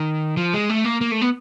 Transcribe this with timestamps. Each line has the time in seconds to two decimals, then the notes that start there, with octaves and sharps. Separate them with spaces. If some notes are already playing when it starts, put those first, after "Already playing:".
Already playing: D#3
0.37 F3
0.54 G#3
0.69 A3
0.84 A#3
1.01 A#3
1.11 A3
1.21 B3